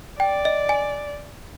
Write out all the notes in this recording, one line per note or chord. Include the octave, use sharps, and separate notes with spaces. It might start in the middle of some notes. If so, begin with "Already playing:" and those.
D5 G5
D#5
G#5